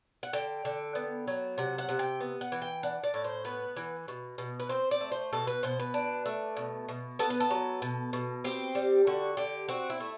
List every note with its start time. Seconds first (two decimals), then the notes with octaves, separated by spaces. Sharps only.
0.23 F#5
0.33 D3 G5
0.65 D3
0.95 B3
1.27 F#3
1.58 C3 F#5
1.78 F#5
1.89 C3
1.99 G5
2.20 B3
2.41 F#5
2.52 E3
2.62 G5
2.83 D4 F#5
3.04 D5
3.14 A2
3.24 C5
3.45 B3 B4
3.76 E3
4.08 B2
4.38 B2
4.60 B4
4.69 C4 C5
4.91 D5
5.01 A3
5.12 C5
5.33 B2 A4
5.47 B4
5.63 B2 C5
5.79 B4
5.94 D4
6.26 A3
6.57 B2
6.88 B2
7.19 B3 A4
7.30 B4
7.40 A4
7.50 F#3
7.82 B2
8.13 B2
8.44 C4 G4
8.75 G3
9.07 D3 F#4
9.37 D3 G4
9.69 C4 F#4
9.90 E4
10.00 A3